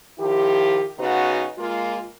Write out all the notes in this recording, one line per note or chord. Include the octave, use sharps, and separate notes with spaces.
D#3 F3 E4 G4
C#3 B3 D#4 F#4
G#3 A#3 F4